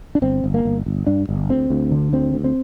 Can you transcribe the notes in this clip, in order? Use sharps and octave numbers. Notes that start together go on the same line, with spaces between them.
D4
G1 C4
G1
A#3
G1
G1
G2 D4
G1
D2 C4
D2
D3
D2 C4
D2
C4